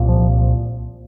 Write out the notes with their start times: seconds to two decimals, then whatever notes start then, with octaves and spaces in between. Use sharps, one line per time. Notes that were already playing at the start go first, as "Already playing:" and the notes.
Already playing: C2 A#2
0.09 F3